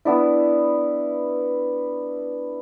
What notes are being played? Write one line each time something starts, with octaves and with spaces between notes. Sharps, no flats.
B3 D4 E4